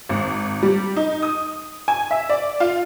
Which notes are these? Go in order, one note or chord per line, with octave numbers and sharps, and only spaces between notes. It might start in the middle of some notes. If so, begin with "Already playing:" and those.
G#1
G3
D#4
D#6
G#5
E5
D5
F4